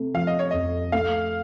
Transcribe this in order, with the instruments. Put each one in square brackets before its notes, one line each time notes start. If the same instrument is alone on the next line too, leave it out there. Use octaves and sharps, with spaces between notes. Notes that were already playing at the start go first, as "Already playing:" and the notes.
Already playing: [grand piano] C3 A3
[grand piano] F3 [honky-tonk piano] F5
[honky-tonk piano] D#5
C#5
[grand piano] F2 [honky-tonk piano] D#5
[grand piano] A3 [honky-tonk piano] F5